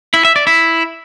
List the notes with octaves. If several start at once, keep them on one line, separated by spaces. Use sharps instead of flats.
E4
E5
D5
E4